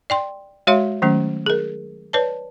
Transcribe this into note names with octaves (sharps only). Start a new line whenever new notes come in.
D5 G5 C6
G#3 F#4 C#5 E5 F5 C6
D#3 F#3 A3 C#4
G#4 A#4
B4 C#5 D5 A5